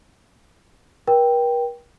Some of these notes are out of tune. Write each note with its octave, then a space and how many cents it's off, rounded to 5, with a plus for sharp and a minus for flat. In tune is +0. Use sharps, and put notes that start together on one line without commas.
A#4 +45 G5 +0